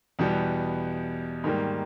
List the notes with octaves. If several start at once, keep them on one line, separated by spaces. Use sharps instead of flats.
E2 B2 G3 B3
G#2 D#3 G3 A#3